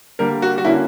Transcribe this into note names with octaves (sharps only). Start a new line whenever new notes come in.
D3 G3 A#3 A#4
F#4
F#4
D3 A#3 C#4 E4